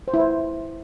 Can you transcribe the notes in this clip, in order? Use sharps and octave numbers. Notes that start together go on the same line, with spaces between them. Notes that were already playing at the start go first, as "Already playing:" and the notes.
C5
E4
C5